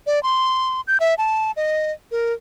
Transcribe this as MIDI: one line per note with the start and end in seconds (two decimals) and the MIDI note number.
0.06 0.22 74
0.23 0.81 84
0.87 0.98 91
1.00 1.15 76
1.18 1.51 81
1.56 1.92 75
2.11 2.33 70